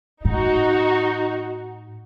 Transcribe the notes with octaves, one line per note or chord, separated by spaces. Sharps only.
A2 D#4 F#4